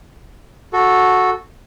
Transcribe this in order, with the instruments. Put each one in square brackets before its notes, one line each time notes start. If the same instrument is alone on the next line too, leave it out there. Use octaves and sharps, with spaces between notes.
[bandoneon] F#4 A4